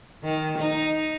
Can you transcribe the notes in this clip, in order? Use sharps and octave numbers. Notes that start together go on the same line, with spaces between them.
D#3
D#4